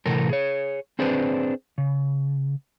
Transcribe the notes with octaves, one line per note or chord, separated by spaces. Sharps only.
A2 C3 E3 A4 A#4
G#4 C#5
C4 D4 G#4 B4 C5
C#3